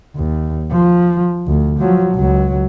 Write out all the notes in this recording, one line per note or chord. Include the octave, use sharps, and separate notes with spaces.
D#2
F3
D2
F3 F#3
C#2 F#3